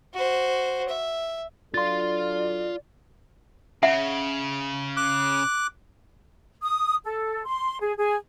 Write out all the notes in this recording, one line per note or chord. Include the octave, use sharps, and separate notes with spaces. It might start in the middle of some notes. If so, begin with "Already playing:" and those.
F#4 C5
E5
F#3 D4 F4 A4 D5 F5 C6 A6
C#3 E5 F#5
D6 F#6
D#6
A4
C6
G#4
G#4